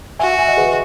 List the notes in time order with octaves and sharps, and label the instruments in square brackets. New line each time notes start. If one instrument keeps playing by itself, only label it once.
[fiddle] F#4 [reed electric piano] E5 G#5
[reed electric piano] E5 G#5
D#5 F#5
G#4 B4